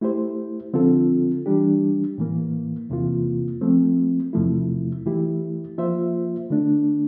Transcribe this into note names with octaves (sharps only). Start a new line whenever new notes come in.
A3 E4 G4 C5
D3 F3 C4 F4 A4
E3 G3 D4 G4
A2 E3 A#3
E2 C3 E3 A#3 F4
F3 A3 C4
E2 C3 F3 A3 E4
E3 A3 E4 G4
F3 A#3 F4 C5 E5
D3 A3 D4